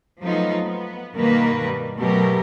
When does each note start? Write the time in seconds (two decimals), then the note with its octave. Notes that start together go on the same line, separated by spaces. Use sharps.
0.21 F3 F#3 A3 B3 D#4 F4
0.62 B3
1.15 G2 B2 D#3 A#3 A#4 B4
1.66 G3
1.97 B2 F#3 A3 G4 A#4